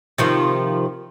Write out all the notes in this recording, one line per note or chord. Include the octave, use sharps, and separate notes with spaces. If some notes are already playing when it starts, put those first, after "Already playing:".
C3 D#3 F3